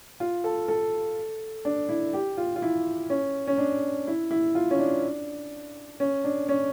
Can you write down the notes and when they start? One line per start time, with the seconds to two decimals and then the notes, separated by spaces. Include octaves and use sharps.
0.20 F4
0.44 A4
0.68 A4
1.65 D4
1.89 E4
2.13 G4
2.37 F4
2.56 F4
2.62 E4
3.10 C#4
3.47 C#4
3.58 D4
4.07 E4
4.31 E4
4.55 F4
4.71 C#4
4.79 D4
6.00 C#4
6.24 D4
6.49 C#4